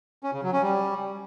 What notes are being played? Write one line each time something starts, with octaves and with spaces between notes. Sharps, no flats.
C#4
C#3
F#3
C#4
G3